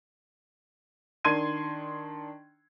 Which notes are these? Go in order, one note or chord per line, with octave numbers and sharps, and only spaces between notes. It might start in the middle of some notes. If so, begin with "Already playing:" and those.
D#3 D4 C6 G#6 D#7